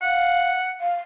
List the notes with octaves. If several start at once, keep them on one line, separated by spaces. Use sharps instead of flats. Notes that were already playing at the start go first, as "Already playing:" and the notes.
F5 F#5
F5